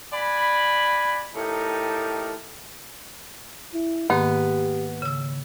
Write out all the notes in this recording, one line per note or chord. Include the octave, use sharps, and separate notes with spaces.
D5 F#5 G#5 B5
A2 D#4 G4 A#4 G5 A5
E4
G#2 D#3 A#3 B3 G4
C#3 E6